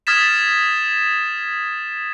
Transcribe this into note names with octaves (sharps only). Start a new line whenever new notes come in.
D#6 F6 G#6 A6 B6 E7